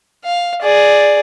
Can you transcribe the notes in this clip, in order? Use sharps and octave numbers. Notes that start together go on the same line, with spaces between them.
F5
G#4 D5